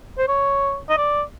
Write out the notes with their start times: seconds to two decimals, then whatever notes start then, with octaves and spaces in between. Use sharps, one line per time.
0.18 C5
0.28 C#5
0.89 D#5
0.98 D5